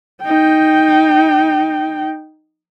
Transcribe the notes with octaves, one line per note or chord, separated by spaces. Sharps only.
D#4 G5